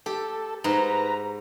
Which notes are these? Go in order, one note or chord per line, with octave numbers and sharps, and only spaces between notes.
G4 A4
G#2 B4 A#5